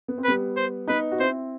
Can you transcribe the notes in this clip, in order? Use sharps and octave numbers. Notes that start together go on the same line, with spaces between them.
B3
C4
G3 B3 B4
C5
B3 D#4 B4
F#4
C4 E4 C5